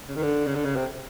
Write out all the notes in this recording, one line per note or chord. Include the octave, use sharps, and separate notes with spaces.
C#3
D#3
D3
C#3
D3
C#3
C3